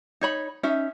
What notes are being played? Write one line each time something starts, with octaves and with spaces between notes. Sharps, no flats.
D#4 C#5 B5
C#4 D#4 E5